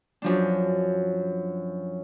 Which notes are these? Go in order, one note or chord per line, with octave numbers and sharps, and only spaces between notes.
F#2 F3 D4